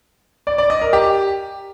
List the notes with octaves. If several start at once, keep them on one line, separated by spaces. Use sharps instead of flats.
D5
D5
D#5
A#4
G4